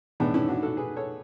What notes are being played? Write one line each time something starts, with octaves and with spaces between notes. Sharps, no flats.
A2 E3 G#3 B3 D4
C#4 E4
D4 F#4
F#4 A4
G#4 B4
A4 C#5